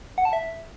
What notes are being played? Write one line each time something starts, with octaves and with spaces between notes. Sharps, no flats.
F#5
A5
E5